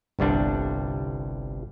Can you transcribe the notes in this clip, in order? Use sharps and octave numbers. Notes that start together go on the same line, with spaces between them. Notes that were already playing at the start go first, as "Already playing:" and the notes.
G1 C2 G3 D4